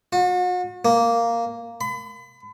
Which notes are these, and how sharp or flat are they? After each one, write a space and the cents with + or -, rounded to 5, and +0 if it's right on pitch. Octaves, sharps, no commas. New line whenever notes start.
F#4 -40
A#3 -5
B5 +35